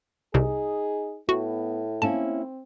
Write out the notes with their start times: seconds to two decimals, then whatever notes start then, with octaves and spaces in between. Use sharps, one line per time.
0.34 C2 C3 D#4 G#4
1.29 A2 B3 F#4
2.02 A#3 C4 C#4 E4 A5